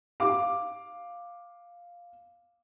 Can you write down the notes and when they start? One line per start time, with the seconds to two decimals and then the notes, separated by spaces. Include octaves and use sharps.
0.20 F5 D6